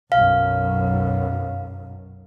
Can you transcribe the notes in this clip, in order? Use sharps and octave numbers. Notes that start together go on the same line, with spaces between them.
B1 F#2 F5